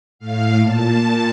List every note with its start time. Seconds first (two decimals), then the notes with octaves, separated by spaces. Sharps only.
0.19 A2 F5
0.60 A#2 A5
1.01 A#2